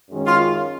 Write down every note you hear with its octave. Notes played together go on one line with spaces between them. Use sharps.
F#2 D#3 G#3 C#4
F4